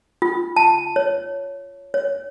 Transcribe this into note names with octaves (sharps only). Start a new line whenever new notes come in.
F4
A5
C#5
C#5